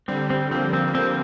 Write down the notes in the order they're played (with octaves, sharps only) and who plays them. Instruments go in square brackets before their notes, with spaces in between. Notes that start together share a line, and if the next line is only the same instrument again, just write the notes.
[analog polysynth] D3 G3 [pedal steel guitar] C4
[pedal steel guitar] C4
[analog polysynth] F3 A#3 [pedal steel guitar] C4
[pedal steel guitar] C4
[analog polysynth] G3
[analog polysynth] F3 A#3 [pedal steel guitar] C4